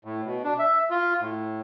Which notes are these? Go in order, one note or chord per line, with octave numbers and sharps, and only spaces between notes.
A2
B2
D4
E5
F4
A2